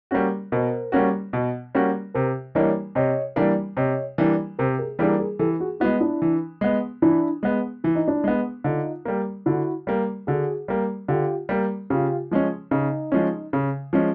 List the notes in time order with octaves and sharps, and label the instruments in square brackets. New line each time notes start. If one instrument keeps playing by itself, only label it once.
[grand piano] G3 A#3 C#4 F#4
[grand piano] B2 [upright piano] A#4 C5
[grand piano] G3 A#3 C#4 F#4
B2
G3 A#3 C#4 F#4
[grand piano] C3 [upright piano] A#4 C5
[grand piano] E3 G3 A#3 D4 [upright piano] C#5 D#5
[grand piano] C3 [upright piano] C#5 D#5
[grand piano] E3 G3 A#3 D4
[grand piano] C3 [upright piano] C#5 D#5
[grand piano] E3 G3 A#3 D4
[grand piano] C3 [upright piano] A#4 C5
[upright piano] G#4 A#4
[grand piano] E3 G3 A#3 D4 [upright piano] G#4 A#4
[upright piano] G#4 A#4
[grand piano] E3 [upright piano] G4 A4
[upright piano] F#4 G#4
[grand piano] G#3 B3 [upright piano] E4 F#4
[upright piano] D4 E4
[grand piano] E3
G#3 B3
[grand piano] E3 [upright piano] D4 E4
[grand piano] G#3 B3
[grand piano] E3 [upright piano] E4
[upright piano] D#4
D4 E4
[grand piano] G#3 B3
[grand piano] D3 [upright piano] D#4 F4
[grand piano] G3 A#3
[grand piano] D3 [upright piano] E4 F#4
[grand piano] G3 A#3
[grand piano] D3 [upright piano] F#4 G#4
[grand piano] G3 A#3
[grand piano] D3 [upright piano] F4 G4
[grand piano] G3 A#3
[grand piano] C#3 [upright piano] F4 G4
[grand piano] F3 G#3 C#4
[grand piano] C#3 [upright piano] D#4
[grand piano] F3 G#3 C#4
C#3
F3 G#3 C#4